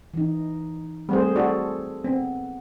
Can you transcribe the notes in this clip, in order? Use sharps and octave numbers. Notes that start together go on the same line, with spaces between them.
E3 D#4
G3 A3 C4 G#4 C5
E4 F#4 A4 D5
B3 C4